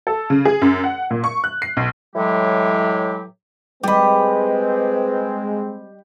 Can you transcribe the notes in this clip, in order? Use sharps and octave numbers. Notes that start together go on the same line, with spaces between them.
A4
C#3
G#4
F#2
F#5
A#2
C#6
F#6
C7
B1
A2 E3 F#3 G#3 G4
G3 G#3 C4 G4 B4 D#5 B5